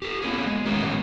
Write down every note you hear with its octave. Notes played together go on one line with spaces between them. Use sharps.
G4 A4
A#3 B3 C#4 G#4
G#3
A2 D#3 B3 C#4 D#4 G4